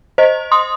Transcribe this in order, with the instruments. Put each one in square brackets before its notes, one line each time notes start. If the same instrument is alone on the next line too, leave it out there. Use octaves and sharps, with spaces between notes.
[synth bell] C5 D#5
C6 D#6